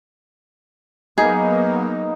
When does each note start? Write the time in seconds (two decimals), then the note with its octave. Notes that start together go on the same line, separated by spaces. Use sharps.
1.18 F#3 A#3 B3 D#4 G#4